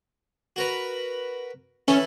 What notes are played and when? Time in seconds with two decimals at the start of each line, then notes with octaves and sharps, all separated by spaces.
0.56 F#4 A#4 B4
1.88 E3 C#4 E4 A4